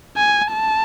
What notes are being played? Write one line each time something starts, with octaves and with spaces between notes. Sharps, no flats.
G#5
A5